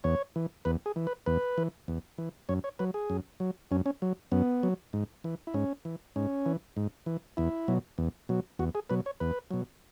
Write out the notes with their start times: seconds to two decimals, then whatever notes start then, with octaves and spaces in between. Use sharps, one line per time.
0.04 E2 C#5
0.36 E3
0.65 E2 B4
0.86 G#4
0.96 E3
1.07 B4
1.26 E2 B4
1.58 E3
1.88 E2
2.18 E3
2.49 F#2 C#5
2.64 C#5
2.79 F#3 B4
2.94 G#4
3.10 F#2
3.40 F#3
3.71 F#2 C#4
3.86 C#4
4.02 F#3
4.32 F#2 B3
4.63 F#3
4.93 G#2
5.24 E3
5.47 E4
5.54 G#2 C#4
5.85 E3
6.16 G#2 C#4
6.46 E3
6.77 G#2
7.06 E3
7.37 E2 E4
7.68 B2 F#3
7.98 E2
8.29 B2 F#3
8.59 E2 F#4
8.75 G#4
8.90 B2 F#3 B4
9.06 C#5
9.20 E2 B4
9.51 B2 F#3